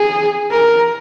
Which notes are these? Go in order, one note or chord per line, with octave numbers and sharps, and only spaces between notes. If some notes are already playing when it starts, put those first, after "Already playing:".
Already playing: G#4
A#4